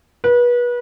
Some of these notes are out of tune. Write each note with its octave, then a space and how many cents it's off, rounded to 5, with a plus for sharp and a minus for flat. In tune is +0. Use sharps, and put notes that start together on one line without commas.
B4 -30